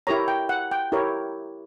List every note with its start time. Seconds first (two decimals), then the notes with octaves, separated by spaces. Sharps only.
0.07 E4 G4 A#4 C#5 A#5
0.28 G5
0.49 F#5
0.71 G5
0.92 E4 G4 A#4 C#5